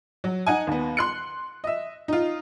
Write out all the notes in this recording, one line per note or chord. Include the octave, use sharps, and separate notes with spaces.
F#3
D#4 F#5 G#5
D#2 B3
C6 F#6 C#7
D#5 E5
D#4 F4